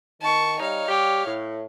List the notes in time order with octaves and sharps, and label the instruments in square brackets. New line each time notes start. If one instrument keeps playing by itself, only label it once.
[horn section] D#3 [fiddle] A5 C#6
[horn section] G3 D#4 [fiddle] C#5 F5
[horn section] G3 G4
A2